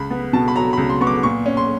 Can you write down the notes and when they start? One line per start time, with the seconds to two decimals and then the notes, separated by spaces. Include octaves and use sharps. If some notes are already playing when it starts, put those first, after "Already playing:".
Already playing: C#2 B5
0.10 B3
0.33 B2 A5
0.48 B5
0.56 F#3 A#5
0.73 C#2 B5
0.90 C6
1.01 B3 C#6
1.07 D6
1.23 A#2 C#6
1.46 C#4
1.57 C6